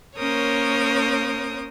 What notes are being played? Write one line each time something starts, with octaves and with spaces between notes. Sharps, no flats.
A#3 C#4 A#4 C5 C#5 D#6